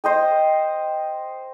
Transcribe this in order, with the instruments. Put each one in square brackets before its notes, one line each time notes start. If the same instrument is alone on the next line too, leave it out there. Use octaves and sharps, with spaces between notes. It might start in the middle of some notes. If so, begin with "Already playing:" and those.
[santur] C5 D#5 G5